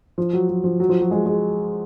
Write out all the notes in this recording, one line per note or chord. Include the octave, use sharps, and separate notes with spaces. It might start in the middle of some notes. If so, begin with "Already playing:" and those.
F3
F#3
F#3
F3
F#3
F3
F#3
G#3
G#3